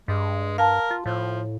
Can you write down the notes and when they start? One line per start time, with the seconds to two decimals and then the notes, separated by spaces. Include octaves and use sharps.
0.08 G2 G#3
0.58 A#4 F5 A5
0.91 F4
1.06 A2 F3